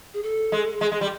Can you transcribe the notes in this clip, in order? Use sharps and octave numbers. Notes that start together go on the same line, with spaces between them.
G#4
A4
G#3
G#3
G#3
G3